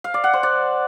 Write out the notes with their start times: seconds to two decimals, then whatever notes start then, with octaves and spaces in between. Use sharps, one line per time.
0.04 F5
0.14 D5
0.24 F#5
0.33 C5
0.43 D5